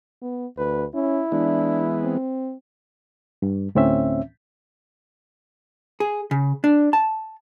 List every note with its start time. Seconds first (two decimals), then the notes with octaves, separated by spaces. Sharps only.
0.22 B3
0.58 D2 B4
0.94 C#4 E4
1.32 E3 G#3 B3 D4
2.03 C4
3.42 G2
3.75 D2 A2 C4 C#4 E5
6.00 G#4
6.31 C#3
6.64 D4
6.93 A5